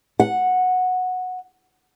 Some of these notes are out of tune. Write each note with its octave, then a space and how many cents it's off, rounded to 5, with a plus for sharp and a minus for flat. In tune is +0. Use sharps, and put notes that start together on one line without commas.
F#5 -10